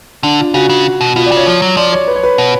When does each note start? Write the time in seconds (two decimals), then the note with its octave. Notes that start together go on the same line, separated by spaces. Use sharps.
0.23 D3 D4
0.39 F4
0.54 C#3 F#4
0.69 C#3
1.01 B2
1.16 B2 F4
1.26 D5
1.32 C#3 C#5
1.46 F3
1.62 F#3
1.77 F3 D5
1.92 C#5
2.08 B4
2.15 C#5
2.23 B4
2.38 B2